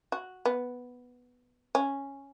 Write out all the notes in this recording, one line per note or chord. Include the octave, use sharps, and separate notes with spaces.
F#4
B3
C#4